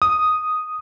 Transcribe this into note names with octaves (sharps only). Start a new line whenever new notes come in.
D#6